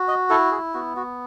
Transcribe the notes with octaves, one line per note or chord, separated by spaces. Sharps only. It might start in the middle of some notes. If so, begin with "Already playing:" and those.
Already playing: F#4
D#5
E4 A4
G#4
B3 F#4
F#4